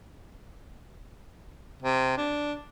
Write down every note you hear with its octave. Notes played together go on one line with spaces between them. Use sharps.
C3
D4